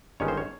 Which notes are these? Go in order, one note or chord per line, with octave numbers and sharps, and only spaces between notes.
G1 G2 D#3 G#3 C#4 C#5
C5
C#5